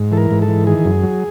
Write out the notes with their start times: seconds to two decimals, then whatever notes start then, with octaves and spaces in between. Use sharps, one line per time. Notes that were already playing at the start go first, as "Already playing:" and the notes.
Already playing: G#2
0.12 E3 A4
0.17 A#4
0.31 G#2
0.42 A4
0.48 E3
0.67 D#3 G#4
0.85 F#2
1.03 F#3